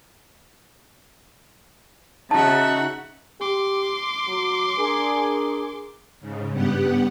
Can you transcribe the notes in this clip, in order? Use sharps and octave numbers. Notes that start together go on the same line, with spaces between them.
C#3 D#4 F#4 E5 F#5 A5
G4 C6 D6
F#3
D4 G#4 A#4
G#2 C#3
G2 B3 G4 F#5